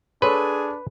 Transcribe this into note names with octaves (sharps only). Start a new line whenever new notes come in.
D4 G#4 A4 B4 C#5 C6